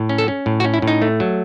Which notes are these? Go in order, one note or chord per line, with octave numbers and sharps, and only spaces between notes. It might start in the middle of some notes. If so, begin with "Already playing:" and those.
Already playing: A2
C#4
A4
C#4
A2
F#4
C#4
E4
A2
D#4
A3
F#3